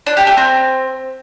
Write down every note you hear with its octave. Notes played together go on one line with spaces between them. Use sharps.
D4
G4
A3
C4